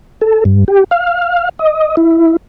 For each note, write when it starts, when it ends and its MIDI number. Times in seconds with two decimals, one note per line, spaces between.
0.21 0.44 69
0.45 0.64 43
0.68 0.84 67
0.91 1.49 77
1.59 1.95 75
1.97 2.36 64